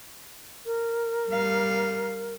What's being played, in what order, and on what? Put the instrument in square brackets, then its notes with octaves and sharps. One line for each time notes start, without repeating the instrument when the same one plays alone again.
[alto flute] A#4
[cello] G3 F5